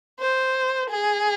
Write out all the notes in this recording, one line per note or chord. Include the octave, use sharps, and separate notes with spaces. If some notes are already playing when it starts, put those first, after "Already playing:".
C5
G#4